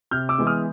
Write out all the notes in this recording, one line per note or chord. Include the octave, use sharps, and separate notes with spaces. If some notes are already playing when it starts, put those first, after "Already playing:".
C3 F6 G6
D6 E6
E3 G#3 B3
D#6 F6